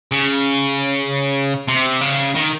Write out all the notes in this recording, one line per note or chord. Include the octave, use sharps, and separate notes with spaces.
C#3
C3
C#3
D#3